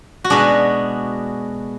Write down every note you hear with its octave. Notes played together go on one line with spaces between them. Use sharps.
F#4
B2 G#3 D4 G#4